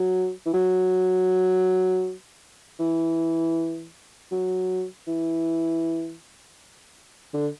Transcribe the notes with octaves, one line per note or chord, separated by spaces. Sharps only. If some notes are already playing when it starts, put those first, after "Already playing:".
Already playing: F#3
E3
F#3
E3
F#3
E3
D3